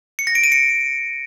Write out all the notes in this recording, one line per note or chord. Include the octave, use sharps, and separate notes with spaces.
C#7
A#6
D7
D#7
C#7